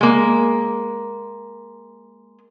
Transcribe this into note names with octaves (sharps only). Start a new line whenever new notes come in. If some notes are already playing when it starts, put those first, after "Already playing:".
G#3 A#3